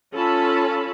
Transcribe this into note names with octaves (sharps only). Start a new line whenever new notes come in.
C#4 F4 A4 A5 B5